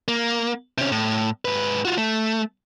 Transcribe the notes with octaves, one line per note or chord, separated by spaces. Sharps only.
A#3
C3 C#4
A2
G#2 B4
F4 F#4
A3